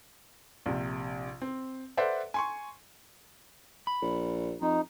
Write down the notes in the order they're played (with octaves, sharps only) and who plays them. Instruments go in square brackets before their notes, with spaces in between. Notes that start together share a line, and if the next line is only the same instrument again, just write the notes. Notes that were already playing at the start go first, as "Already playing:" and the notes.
[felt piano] A#1 C3
C4
A4 B4 C5 D5 E5 F#5
G#5 C6 C#6
[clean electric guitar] B5
[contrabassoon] A#1
[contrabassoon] F2 [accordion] D#4